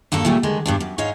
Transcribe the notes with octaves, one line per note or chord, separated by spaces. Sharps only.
G2 A#3 F#4 A4
A#2 C#3 G3 A3
D3 D#3 G#3
G2 B2 D4
F#2
G#2 C#5 D#5 F5